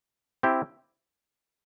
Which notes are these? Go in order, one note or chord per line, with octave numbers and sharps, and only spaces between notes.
C4 E4 G4